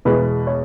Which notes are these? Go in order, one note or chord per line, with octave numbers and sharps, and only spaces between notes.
E2 B2 G#3 B4
C#5